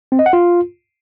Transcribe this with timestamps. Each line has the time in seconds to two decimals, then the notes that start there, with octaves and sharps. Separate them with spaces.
0.12 C4
0.19 D#5
0.26 F#5
0.33 F4